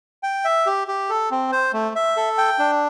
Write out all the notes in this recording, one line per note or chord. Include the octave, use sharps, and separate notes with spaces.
G5
E5
G4
G4
A4
C4
C5
A3
E5
A4
G5
D4